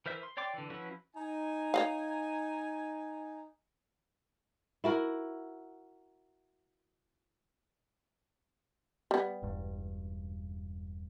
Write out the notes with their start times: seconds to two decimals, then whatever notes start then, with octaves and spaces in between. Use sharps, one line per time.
0.06 E3 A#4 C5 E5
0.23 C6
0.37 C#5 D5 G5 C6 D6
0.54 D3 E3
0.70 F3 C#4 E4 F#4 B4
1.16 D#4 G#5
1.74 C#5 D#5 F5
4.84 E4 F#4 A#4
9.11 G3 B3
9.43 E1 G2